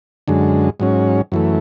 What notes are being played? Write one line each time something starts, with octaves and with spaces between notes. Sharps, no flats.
F#2 D3 G#3
G#2 F#3 C#4
F#2 E3 A3